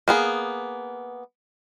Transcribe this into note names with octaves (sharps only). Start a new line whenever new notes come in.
A#3 B3 G#4